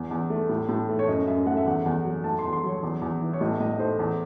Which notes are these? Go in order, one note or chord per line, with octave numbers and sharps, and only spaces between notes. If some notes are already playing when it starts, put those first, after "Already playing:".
Already playing: E2
E2
A3
A2
A2
A3
C#5
F#2 D#5
F#2 E5
A3 F#5
E5
E2 F#5
E2
F#3
A3 A5
C6
E2
C6
F#3 C#5
E2
E2
E3
C#5
A2 D#5
A2 D#5
A3 C5
E2